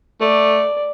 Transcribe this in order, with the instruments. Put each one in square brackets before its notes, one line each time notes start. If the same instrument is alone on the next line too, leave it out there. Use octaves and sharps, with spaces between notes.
[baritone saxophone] A3 [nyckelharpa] D5